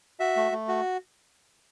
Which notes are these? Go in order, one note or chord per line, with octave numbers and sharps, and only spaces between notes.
F#4 E5
A3
A3
F#4